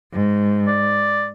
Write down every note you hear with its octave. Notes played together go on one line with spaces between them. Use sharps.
G#2
D5